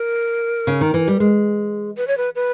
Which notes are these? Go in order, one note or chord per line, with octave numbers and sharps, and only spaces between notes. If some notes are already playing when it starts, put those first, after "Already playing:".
Already playing: A#4
C#3
D#3
E3
G3
G#3
B4
C#5
B4
B4